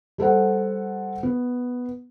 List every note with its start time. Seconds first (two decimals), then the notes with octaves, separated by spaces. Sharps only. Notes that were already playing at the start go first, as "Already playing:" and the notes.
0.18 G3 A4 C5 F#5
1.23 B3